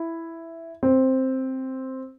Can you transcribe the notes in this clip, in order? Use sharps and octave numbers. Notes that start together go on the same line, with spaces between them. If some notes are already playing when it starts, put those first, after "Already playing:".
Already playing: E4
C4